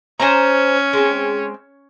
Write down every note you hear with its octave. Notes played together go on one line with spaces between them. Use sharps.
C#4 C5 G#5 A#5
G#3 C4